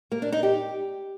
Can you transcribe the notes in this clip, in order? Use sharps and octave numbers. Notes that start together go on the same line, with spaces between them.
A#3
D4
D#4
G4